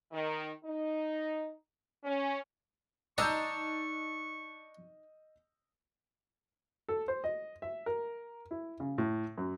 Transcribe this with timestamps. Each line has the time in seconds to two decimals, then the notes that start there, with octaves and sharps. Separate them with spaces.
0.12 D#3
0.64 D#4
2.04 C#4
3.18 D4 D#4 D#5 A5 A#5 C#6 E6 G6
6.89 A4
7.08 C5
7.24 D#5
7.62 E5
7.86 A#4
8.51 E4
8.80 C#3
8.98 A2
9.38 F#2